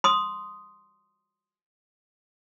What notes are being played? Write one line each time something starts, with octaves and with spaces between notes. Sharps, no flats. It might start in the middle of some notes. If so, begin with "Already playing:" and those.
C6 D#6